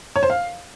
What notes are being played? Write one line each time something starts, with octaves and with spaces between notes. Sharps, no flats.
C#5
C5
F5